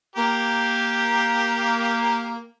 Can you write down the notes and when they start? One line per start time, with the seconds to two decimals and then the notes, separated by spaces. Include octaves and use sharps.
0.16 A#3 G4 A#4